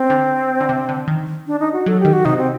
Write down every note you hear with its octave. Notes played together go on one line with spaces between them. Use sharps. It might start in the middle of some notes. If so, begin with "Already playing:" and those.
Already playing: C4
D3
D3
C3
D3
D#3
D4
D#4
F#4
F#3 A4
D#3 G4
F#4
C3 D#4
C4